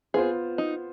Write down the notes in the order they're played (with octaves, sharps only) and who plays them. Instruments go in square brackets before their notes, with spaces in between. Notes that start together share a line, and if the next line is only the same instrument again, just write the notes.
[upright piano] B3 F4 C5 [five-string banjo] G#4
[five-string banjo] D#4